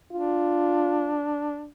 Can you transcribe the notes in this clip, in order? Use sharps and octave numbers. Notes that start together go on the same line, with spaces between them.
D4 F4